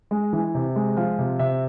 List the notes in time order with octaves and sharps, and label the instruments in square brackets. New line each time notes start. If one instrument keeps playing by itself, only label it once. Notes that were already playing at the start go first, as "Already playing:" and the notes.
[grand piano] G#3
E3
C3
G#3
F3 F5
C3
C3 E5